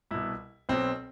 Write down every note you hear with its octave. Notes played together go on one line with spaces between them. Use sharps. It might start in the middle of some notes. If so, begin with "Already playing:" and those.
C2 B2 E4
B1 B2 C4